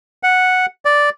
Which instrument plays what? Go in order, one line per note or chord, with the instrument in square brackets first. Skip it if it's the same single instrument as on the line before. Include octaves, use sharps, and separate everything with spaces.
[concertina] F#5
D5